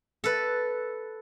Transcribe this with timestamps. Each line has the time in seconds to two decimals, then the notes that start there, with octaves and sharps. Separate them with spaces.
0.24 A4 B4